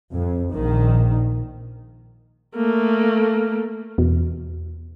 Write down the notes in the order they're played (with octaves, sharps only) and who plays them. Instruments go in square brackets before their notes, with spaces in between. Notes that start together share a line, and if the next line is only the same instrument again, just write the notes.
[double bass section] F2
A#1 D#3
[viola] A3 A#3
[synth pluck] E2 B2